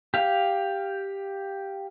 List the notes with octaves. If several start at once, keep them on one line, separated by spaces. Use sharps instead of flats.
G4 F5